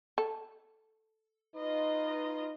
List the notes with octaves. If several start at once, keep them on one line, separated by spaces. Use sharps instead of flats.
A4
D#4 F4 B4 D#5